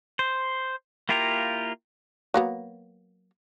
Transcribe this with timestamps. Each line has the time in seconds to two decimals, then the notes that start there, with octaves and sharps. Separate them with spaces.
0.19 C5
1.09 A#3 E4 F4 G4 A#4
2.34 F#3 A#3 B3